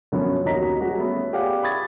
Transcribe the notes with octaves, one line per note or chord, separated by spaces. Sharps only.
F#2 D3 F3 B3 C#4 F4
D#2 C#4 F#4 D#5 A#5 B6
G3 F#4 G#4 F#5
A3 B3 C#4
G4 G#4 D5 F5 F#5
B5 C#6 D#6 G#6 A6